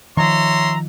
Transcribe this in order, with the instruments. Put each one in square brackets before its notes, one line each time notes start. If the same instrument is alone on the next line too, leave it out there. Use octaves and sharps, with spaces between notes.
[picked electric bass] D#3 F3 [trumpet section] C#5 E5 C6 [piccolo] A#5